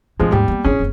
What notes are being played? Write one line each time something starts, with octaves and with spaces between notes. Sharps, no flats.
G2 F3 G3 G#3
D#2 G#2 G3
A#3 B3
G1 C#4 E4 G#4
F#1 C4